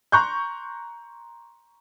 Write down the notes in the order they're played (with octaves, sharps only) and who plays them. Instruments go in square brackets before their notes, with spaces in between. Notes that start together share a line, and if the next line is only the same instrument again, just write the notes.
[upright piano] A#5 C6 C#6 F#6 G6